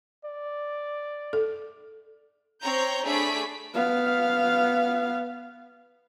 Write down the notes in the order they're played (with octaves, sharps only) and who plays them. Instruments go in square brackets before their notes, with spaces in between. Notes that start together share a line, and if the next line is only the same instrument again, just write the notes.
[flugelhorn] D5
[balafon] A4
[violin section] C4 C#5 A#5 G6
A3 D4 G#4 B5 B6 D7
[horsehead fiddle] B3 F5